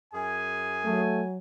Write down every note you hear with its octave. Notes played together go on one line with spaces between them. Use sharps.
F#2 G#4 G#5
F#3 A3